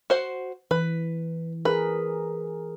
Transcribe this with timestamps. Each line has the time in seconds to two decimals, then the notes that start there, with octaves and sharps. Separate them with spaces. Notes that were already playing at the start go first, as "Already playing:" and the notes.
0.10 F#4 C5 F#5
0.71 E3 B4
1.65 G#4 A#4 B4